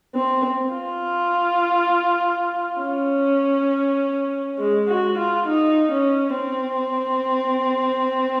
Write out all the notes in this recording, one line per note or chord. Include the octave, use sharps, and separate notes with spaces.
C4
F4
C#4
G#3
F#4
F4
D#4
C#4
C4